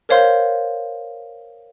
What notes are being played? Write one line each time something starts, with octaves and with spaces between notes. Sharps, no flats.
A#4 C5 C#5 F5 C6 G6